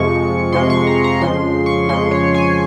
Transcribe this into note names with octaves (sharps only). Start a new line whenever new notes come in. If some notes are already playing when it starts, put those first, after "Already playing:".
Already playing: F2 C3 F3 G#3 C#6
F2 C3 F3 G#3 C6
C#6
A#5
A#5
F2 C#3 F3 G#3 C6
C#6
F2 C#3 F3 G#3 C6
C#5
G#5